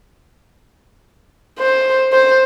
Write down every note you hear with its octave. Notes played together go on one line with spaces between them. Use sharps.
C5
C5